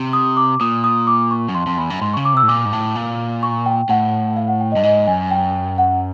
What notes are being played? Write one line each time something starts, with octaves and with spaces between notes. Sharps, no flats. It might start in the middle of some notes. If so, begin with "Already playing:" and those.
Already playing: C3
D#6
D6
A#2 D#6
D#6
D6
C#6
F#2
F2 C6
F2 C6
E2 B5
F#2
G#2 C6
C#3 C#6
D6
C3 E6
A2
A#2 D6
G#2
A2
A#2
C#6
G5
A2 F#5
F5
F#5
G5
D#5
G2
G#2 D#5
F#2 G#5
G5
F#5